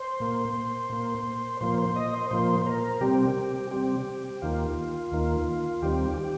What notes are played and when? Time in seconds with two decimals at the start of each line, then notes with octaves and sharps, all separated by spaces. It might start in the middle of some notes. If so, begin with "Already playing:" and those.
Already playing: C5
0.20 A#2 A#3
0.90 A#2 A#3
1.61 A#2 F3 A#3 C5
1.78 C5
1.96 D#5
2.13 C5
2.31 A#2 F3 A#3 C5
2.62 C5
2.66 A#4
3.01 C3 G3 C4 G4
3.71 C3 G3 C4 G4
4.42 D#2 D#3 A#3 F4
5.12 D#2 D#3 A#3
5.82 D#2 D#3 G3 C4 G4
6.18 G4